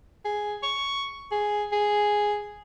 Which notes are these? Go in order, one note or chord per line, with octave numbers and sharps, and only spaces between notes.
G#4
C#6
G#4
G#4